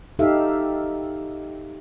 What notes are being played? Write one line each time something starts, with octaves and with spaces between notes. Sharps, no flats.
D#4 G4 A4 E5 F5